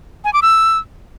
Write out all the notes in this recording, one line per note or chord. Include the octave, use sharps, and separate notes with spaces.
G#5
D6
E6